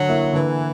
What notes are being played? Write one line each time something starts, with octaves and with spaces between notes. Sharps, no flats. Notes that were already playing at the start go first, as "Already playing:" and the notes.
Already playing: D3 F#3
A#3 E4
D3 E3